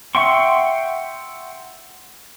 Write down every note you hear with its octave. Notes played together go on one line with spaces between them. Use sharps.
E5 F#5 G5 C6 C#6